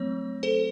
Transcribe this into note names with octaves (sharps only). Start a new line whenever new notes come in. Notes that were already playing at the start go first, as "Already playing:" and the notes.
Already playing: F#3 A3 C4 C#5
A4 C5